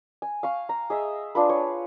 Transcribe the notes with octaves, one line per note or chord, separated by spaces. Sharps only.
G#5
F5 C#6
A#5
G#4 D#5 E5
D4 F4 B4
C#5